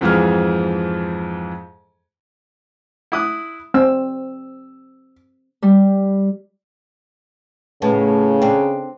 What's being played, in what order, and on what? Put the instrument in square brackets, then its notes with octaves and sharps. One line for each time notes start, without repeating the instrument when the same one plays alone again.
[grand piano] F2 G#2 E3 F3 G#4 F6
[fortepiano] E4 D#6 F#6
[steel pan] C4 [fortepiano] E6
[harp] G3
[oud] A2 B3 [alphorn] C#3
[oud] C4 D4